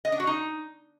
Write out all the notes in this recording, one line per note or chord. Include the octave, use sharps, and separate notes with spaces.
D#5
D4
F#4
D#4